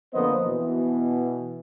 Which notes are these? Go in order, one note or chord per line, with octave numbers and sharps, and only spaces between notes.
F2 D3 A#3 B3 C5 D#5
B2 E3